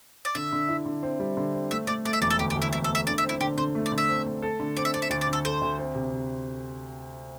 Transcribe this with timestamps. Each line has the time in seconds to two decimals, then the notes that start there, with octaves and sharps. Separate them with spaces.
0.25 D5
0.35 D3 E5
0.52 D3
0.69 E4
0.85 D3
1.03 C4
1.20 G3
1.37 D3
1.54 C4
1.71 A3 E5
1.87 A3 D5
2.05 A3 D5
2.13 E5
2.21 E1 D5
2.30 A4
2.38 D2 G4
2.50 G4
2.55 D2
2.62 E4
2.73 E1 E4
2.84 A4
2.90 A3
2.95 E5
3.07 D3 D5
3.18 E5
3.24 C4 E4
3.40 D3 G4
3.57 D3 C5
3.75 A3
3.86 D5
3.92 D3
3.98 E5
4.09 C4
4.26 A3
4.42 A4
4.60 D3
4.77 C4 D5
4.85 E5
4.94 C4 D5
5.02 E5
5.10 D2 D5
5.21 D5
5.27 D3
5.33 A4
5.45 A4 C5
5.61 D2
5.78 C4
5.95 C3
6.12 C3